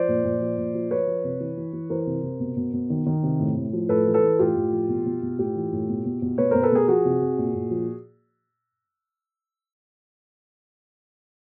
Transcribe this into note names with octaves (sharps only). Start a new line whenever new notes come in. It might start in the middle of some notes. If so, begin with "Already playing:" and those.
Already playing: F3 C5 D5
A#2
A#2
F3
A#2
F3
F3 B4 C#5
F3
C3
E3
E3
E3
E3 A#4 C5
C3
C3
B2
B2
B2
D#3
D#3
C3
A2
A2
F3
A2 A4 B4
E3
A4 B4
E3
A2 F4 G4
A2
F3
B2
B2
B2
A2 F4 G4
E3
A2
B2
B2
B2
B2 B4 C#5
B2 A#4 C5
A4 B4
B2 G#4 A#4
F3 F#4 G#4
C3
C3
A#2
A#2
F3